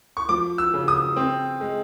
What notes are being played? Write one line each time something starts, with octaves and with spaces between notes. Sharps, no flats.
C#6
F3 D6
E6
C#3
D#6
C4
G#3